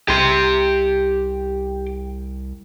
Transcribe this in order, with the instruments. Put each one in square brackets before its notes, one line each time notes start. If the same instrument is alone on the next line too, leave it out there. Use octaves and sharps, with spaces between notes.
[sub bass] C2 [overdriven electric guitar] G4 C6